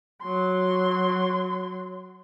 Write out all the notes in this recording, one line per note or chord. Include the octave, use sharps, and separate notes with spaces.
F#3 C6